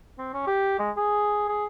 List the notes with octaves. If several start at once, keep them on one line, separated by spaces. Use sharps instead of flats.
C4
C#4
G4
G#3
G#4
G#4